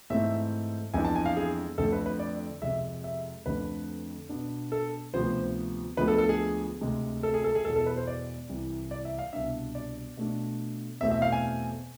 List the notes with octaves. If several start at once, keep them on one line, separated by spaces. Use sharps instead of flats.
G#2 E3 A3 C4 E5
F2 E3 G#3 B3 D4 G#5
A5
G#5
F5
G#4
F2 D3 A3 A4
B4
B4
D5
F2 C3 G#3 E5
E5
F2 D3 A3 C4 B4
B2 B3 D4
A4
D2 C3 F3 B3 C5
D2 D3 F3 G#3 B3 B4
A4
A4
G#4
D2 C3 G#3
A4
G#4
A4
G#4
E2 B2 G#3 A4
A4
B4
C5
D5
C2 C3 E3
D5
E5
F5
C2 B2 B3 D4 E5
D5
B2 A3 D4
E2 B2 A3 C4 E5
E5
F5
G#5